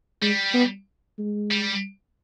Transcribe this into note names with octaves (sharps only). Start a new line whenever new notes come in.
G3 G#3
B3
G#3
G3